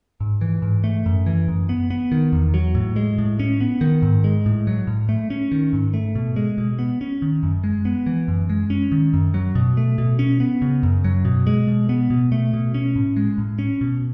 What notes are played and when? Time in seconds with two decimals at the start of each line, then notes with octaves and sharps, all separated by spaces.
0.20 G#2
0.41 E3
0.62 G#2
0.84 A3
1.06 F#2
1.26 E3
1.48 F#2
1.69 B3
1.90 B3
2.12 D#3
2.32 E2
2.54 F#3
2.75 A2
2.96 G#3
3.18 A2
3.40 C#4
3.61 B3
3.81 D#3
4.02 G#2
4.24 G#3
4.46 A2
4.67 F#3
4.87 A2
5.09 A3
5.30 C#4
5.52 D#3
5.73 G#2
5.94 A3
6.15 B2
6.36 G#3
6.58 B2
6.79 B3
7.01 C#4
7.22 D#3
7.43 F#2
7.64 G#3
7.85 B3
8.06 E3
8.28 F#2
8.50 G#3
8.70 C#4
8.92 D#3
9.13 F#2
9.34 F#3
9.55 B2
9.77 A3
9.98 B2
10.19 C#4
10.40 B3
10.62 C#3
10.83 F#2
11.04 F#3
11.25 B2
11.47 G#3
11.68 B2
11.89 B3
12.10 B2
12.32 A3
12.54 B2
12.74 C#4
12.96 A2
13.17 G#3
13.38 A2
13.59 C#4
13.81 B2